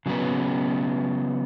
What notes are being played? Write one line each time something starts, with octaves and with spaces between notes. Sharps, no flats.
C#3 F#3 B3